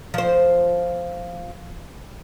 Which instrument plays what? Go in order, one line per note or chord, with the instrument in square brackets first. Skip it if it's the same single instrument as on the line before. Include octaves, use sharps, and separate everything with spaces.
[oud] F3 C5